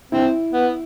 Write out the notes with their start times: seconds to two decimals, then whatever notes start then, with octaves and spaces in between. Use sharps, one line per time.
0.12 C4 E4
0.52 B3